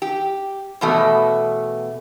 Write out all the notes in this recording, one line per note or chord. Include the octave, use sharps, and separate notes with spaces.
G4
E2 B2 A3